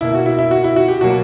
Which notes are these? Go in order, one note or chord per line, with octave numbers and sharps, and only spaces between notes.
B2 A#3 E4
F#4
E4
E4
F#4
E4
F#4
G4
B2 F#3 A#3 F#4